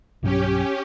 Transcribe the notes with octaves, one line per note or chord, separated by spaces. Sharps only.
B1 G2 F#3 C#4 G4